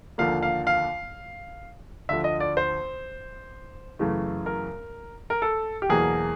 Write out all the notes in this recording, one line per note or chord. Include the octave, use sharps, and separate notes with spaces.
D#2 D3 F3 A#3 F5
F5
F5
D2 D3 F3 E5
D#5
D5
C5
F#2 C#3 E3 A3
A#4
A#4
A4
G4
E2 B2 F#3 A#3 G#4